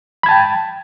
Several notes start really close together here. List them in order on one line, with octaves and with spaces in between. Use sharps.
B5 G#6 A5 G5